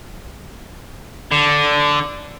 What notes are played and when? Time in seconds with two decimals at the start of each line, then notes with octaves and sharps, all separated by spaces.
1.32 D3